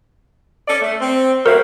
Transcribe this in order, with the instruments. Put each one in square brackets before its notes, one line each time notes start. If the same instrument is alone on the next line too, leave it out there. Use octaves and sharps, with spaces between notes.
[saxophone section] C#4 A4 D5
A3
C4
[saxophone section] G3 A#3 F#4 [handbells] A#4 C5 E5